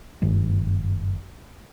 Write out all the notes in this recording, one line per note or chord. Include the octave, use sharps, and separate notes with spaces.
F#1 G2 D#3 G#3